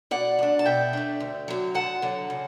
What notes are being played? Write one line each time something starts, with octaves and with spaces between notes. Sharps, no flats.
B2 D5 F#5
A3 D4
A5
B2 E5 G5
A3 D4
D2
D3 F#3
D2 F#5 A5
D3 F#3
C#3